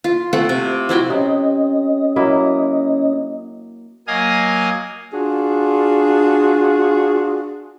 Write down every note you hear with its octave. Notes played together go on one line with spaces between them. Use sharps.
F4
A3 C4 F4 F#5
C3
F3 E4 F#4 G5
C3 C#4 D#5
F#3 A#3 E4
F#3 A#3 D#5 F5 G#5 D#6
D4 F4 F#4 G#4